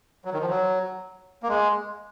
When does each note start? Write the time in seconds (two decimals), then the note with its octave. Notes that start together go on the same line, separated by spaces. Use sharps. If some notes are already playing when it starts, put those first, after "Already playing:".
0.25 F#3
0.33 D#3
0.41 F3
0.49 F#3
1.43 A#3
1.48 G#3